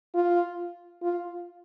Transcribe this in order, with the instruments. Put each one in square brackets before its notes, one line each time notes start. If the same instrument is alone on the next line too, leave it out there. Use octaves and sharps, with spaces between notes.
[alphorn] F4
F4